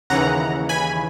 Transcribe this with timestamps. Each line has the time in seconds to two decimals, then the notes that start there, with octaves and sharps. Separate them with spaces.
0.10 D#2 C#3 E3 F#5 A#5
0.69 G#5 B5